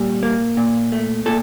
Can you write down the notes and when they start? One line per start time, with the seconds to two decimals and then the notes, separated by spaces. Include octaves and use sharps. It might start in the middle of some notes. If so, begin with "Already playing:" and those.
Already playing: A#2 G3
0.23 A#3
0.57 A#2
0.92 A3
1.26 A#2 A4